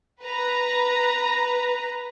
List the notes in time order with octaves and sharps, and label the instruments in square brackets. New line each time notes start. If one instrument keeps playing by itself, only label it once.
[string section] B4 A#5